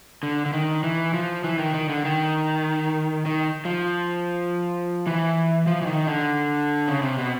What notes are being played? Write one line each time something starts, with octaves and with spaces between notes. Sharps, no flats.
D3
D3
D#3
E3
F3
E3
D#3
D#3
D3
D#3
D#3
F3
E3
F3
E3
D#3
D3
C#3
C3
B2